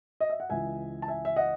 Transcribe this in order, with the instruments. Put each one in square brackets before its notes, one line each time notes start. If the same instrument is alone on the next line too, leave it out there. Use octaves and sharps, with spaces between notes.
[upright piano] D#5
E5
F#5
C#2 C#3 E3 E5 G#5
A5
E5 G#5
E5
D#5 F#5